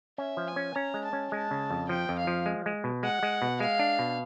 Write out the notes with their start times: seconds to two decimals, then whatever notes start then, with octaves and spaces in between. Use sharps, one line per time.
0.18 C#4 E5
0.37 F3
0.48 G#5
0.56 C#4
0.75 C#4 A#5
0.94 G#3
1.04 A5
1.13 C#4
1.32 G#3 A5
1.51 C#3
1.71 F2
1.89 F3 G5
2.09 F2
2.19 F5
2.27 F3
2.46 G#3
2.66 G#3
2.84 B2
3.03 G#3 F#5
3.23 G#3
3.42 B2
3.60 G#3 F5
3.79 D4
3.99 B2